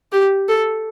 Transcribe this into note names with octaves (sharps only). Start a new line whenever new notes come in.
G4
A4